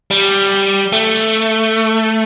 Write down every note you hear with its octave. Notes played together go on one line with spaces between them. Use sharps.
G3
A3